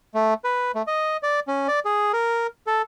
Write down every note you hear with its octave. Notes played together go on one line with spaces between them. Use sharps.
A3
B4
A3
D#5
D5
C#4
D5
G#4
A#4
A4